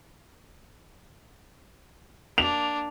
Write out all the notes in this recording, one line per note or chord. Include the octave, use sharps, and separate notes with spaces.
A#3 D4 F7